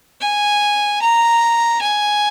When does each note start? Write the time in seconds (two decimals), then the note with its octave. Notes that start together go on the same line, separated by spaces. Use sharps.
0.21 G#5
1.02 A#5
1.82 G#5